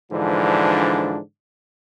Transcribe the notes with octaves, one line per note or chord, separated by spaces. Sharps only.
G#2 D3 E3 F3 D4